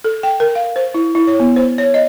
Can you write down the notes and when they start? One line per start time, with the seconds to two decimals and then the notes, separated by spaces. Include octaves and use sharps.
0.05 A4
0.23 G5
0.40 A#4
0.55 F5
0.76 C5
0.94 E4
1.15 E4
1.27 C#5
1.40 B3
1.56 C5
1.78 C#5
1.94 D#5